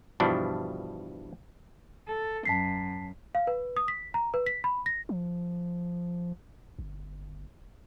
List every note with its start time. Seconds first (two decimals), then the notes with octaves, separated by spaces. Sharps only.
0.20 G2 B2 E3 F3 D4
2.06 A4
2.45 F#2 A5 B6 C7
3.35 F5
3.47 B4
3.76 D#6
3.88 B6
4.14 A#5
4.34 B4
4.46 B6
4.64 B5
4.86 A#6
5.09 F3
6.79 G1